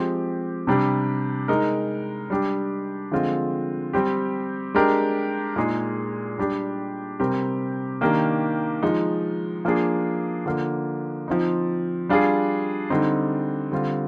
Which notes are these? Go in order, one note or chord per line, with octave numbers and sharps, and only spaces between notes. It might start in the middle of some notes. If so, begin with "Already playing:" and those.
Already playing: F3 G#3 C4 G4
C3 G3 D4 G4
G#3 D#4 A#4
G3 D4 G4
D3 F3 G#3 C4 F4
G3 C4 G4
G#3 D4 G4 A#4
A#2 G#3 D#4 G#4
G3 D4 G4
C3 G3 C4 G4 A#4
D#3 A#3 D4 G4 A#4
F3 G#3 D#4
F3 A#3 D4 G#4
D3 F3 A#3
F3 C4 D#4
G3 D4 F4 G#4
D3 G3 C4 D#4
D3 G3 C4 F4